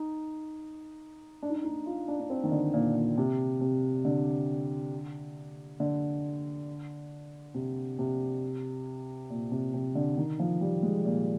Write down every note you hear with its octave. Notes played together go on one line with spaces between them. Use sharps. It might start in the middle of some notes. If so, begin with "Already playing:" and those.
Already playing: D#4
D4
D#4
D4
D#4
F4
D4
D4
C4
D#3
D3
A#2
A#2
C3
C3
D3
D3
C3
C3
A#2
C3
C3
D3
D#3
F3
G3
G#3
A#2